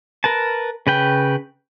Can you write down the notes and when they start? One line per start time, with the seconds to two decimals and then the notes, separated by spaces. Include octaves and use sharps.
0.24 A#4 B4 A5
0.87 C#3 B4 G5